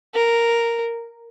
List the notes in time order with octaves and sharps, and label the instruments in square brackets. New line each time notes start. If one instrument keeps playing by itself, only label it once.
[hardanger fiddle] A#4